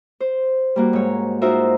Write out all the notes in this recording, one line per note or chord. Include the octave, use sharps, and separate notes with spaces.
C5
G3 A#3 F#4
G#2 C#5
D#4 F4 F#4 A#4 C5 E5